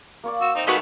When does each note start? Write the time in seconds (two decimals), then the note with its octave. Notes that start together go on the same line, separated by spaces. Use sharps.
0.24 A#3 C#5 D5
0.41 F#4 C5 E6
0.56 C4 D#4
0.67 D#3 G#3 A3 F#4 B4 D#5